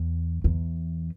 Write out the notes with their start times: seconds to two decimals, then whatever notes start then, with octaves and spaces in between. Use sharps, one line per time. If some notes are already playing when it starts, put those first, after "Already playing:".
Already playing: E2
0.44 E2